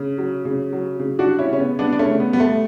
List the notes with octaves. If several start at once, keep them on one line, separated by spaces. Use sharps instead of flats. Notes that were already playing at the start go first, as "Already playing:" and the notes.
Already playing: C#3
F#3
C#3
F#3
C#3
D4 F#4
G3
C#4 E4
C#3 C#4
B3
G3 B3 D4
D4
A3 C#4
C#3
B3
G3 B3
A3